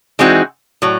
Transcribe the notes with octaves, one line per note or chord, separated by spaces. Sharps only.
E3 G#3 C4 D#4 F#4
A2 F#3